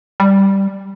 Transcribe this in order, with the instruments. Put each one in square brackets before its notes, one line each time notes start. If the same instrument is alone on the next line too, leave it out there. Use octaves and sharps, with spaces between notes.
[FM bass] G3